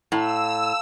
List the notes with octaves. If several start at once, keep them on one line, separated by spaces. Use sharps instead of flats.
A2 F5 A#5 E6